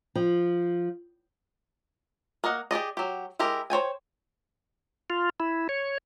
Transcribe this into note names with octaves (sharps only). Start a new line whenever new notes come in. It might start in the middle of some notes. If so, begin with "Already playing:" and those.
F3
A#3 A#4 D#5 F#5
G4 G#4 D5 D#5
F#3 G4
G#3 E4 G4 A#4
C5 C#5 G5 G#5
F4
E4
C#5